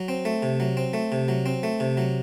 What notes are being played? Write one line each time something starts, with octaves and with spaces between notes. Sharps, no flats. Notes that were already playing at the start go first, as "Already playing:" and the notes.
Already playing: F#3
C4
A3
C3
F#3
C4
A3
C3
F#3
C4
A3
C3
F#3